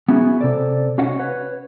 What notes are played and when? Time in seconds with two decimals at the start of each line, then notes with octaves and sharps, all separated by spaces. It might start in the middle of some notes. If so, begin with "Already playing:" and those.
0.08 B3 C#4 E4 F#4 G#4
0.41 C3 A4 D5
0.98 C#4 F#4 C#5 D#5 F5 F#5
1.19 B4 C#5